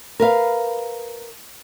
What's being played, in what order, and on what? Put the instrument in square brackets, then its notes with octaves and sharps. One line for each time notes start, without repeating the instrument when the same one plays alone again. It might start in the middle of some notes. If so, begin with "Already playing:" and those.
[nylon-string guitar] A#4 B4 F5